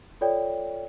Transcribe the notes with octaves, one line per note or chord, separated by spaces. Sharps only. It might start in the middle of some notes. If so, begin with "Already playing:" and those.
F4 A4 C#5 D5 G5